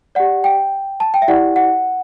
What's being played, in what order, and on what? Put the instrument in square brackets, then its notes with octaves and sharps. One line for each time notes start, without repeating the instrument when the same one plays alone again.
[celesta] G4 D5 F#5
G5
A5
G5
E5
E4 G4 D5 F#5
F#5